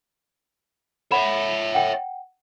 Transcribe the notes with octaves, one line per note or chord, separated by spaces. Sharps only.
C#5 E5 F#5 B5 E7
F#5 G5